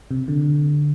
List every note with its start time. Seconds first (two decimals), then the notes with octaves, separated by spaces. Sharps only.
0.11 C3
0.28 D3